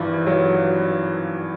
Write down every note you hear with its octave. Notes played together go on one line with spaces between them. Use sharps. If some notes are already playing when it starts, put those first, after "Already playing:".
Already playing: G#1 G2 E3 F3
F#3